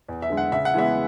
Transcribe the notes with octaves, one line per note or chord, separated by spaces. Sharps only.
E2
E5
D3 G#3
F#5
C#3 E5
F#5
E3 G#3 B3 E5